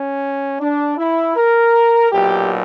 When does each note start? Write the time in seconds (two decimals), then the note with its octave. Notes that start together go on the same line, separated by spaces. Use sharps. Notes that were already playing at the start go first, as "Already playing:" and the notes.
Already playing: C#4
0.60 D4
0.97 E4
1.35 A#4
2.11 B1 A#2 F#3 G4